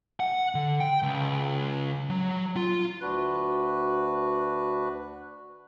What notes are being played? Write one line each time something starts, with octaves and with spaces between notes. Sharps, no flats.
F#5
D3
G5
C#2
F#3
F4
D2 D4 F#4 B4 F#6